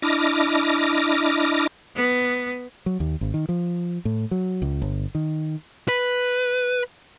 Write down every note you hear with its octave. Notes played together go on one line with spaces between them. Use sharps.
D4 E4 D#5 D6 F6 A#6
B3
F#3
D#2
G#1
D#3
F3
A2
F#3
C#2
G1
D#3
B4